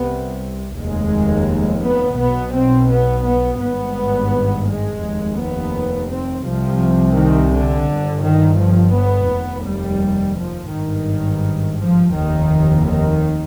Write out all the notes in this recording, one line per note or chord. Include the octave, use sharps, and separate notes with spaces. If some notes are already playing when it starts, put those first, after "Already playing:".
Already playing: C2 C3 B3
F1 D#2 G#3
B3
B1 B2 B3
C4
B3
B3
G#1 G2 B3
G#3
F1 D#2
B3
C4
C2 C3 F3
D#3
D3
G1 G2
D#3
F3
B3
F1 D#2
G3
F3
G#1 G2 D#3
F3
F1 D#2 D#3
D#3